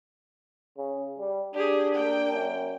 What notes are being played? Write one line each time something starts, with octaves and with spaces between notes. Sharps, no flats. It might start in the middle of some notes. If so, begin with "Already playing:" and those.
C#3
G3
D4 G4 G#4
A#3 G5
F#2